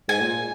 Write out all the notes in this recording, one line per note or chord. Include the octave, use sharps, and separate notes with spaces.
G#2 G#5
A#2